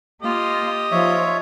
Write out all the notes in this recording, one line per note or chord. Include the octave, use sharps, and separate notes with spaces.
A#3 F4 G4 D#5
F3 D#4 F4 C#5 E5